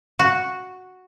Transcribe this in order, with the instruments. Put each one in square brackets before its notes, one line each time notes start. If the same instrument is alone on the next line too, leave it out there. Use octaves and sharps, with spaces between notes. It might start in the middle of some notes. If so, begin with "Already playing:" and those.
[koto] F#4